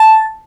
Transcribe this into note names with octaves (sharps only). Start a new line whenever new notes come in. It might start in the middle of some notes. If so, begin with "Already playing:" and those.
Already playing: A5